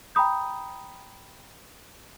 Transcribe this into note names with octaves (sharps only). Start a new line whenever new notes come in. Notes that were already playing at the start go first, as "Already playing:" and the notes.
G5 A#5 B5 D#6 G6